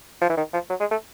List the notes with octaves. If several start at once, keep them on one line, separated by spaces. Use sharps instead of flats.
F3
E3
D#3
F3
F#3
G#3
A3